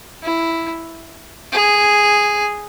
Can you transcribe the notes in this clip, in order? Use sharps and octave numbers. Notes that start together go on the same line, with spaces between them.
E4
G#4